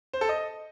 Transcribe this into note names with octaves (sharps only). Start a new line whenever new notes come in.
C5
A4
D#5